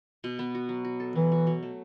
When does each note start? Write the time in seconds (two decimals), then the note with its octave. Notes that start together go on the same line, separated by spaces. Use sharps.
0.24 B2
0.39 B3
0.55 F#4
0.69 F#3
0.85 F#4
1.00 A4
1.15 E3 F#3
1.32 F#4
1.47 F#3
1.63 A3